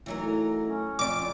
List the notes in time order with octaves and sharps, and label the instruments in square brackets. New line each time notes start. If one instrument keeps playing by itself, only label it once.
[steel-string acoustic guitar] E3 F#3 A#4 [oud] A3 D#4
[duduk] C#4
[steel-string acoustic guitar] F2 D5 [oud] C#3 [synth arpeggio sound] D6 D7